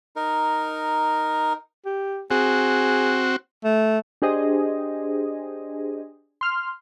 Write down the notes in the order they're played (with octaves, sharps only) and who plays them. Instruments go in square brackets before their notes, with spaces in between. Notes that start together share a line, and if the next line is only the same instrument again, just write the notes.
[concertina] D#4 A#4
[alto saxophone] G4
[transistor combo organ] C4 F#4 [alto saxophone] G#4
[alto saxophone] A3
[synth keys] D4 G4 G#4 C5 D#5
C6 F6